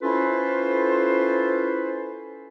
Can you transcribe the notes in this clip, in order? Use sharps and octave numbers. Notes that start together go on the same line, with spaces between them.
C#4 E4 F4 A4 B4 C5